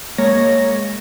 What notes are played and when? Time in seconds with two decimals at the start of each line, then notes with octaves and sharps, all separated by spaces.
0.18 G#3 A#3 C#5 A#6